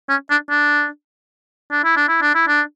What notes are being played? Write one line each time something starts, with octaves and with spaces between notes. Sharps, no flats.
C#4
D4
D4
D4
E4
D4
E4
D4
E4
D4